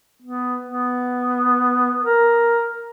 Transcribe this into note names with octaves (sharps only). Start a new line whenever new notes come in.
B3
B3
A#4